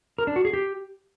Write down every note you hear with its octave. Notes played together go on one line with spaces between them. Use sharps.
A#4
D4
F#4
G#4
G4